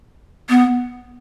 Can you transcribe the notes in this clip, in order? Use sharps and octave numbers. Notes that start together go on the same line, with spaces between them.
B3